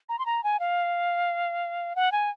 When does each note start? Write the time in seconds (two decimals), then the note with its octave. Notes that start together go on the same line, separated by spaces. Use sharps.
0.09 A#5
0.19 C6
0.26 A#5
0.44 G#5
0.59 F5
1.96 F#5
2.12 G#5